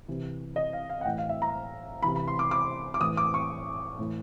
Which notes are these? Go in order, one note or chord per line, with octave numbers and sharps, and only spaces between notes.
C3 E3
D#5
F5
F5
F#5
A2 E3 G5
F5
E5
A#5
C3 E3 B5
B5
C6
D6
D6
D6
A2 E3 D#6
D6
C#6
A2 E3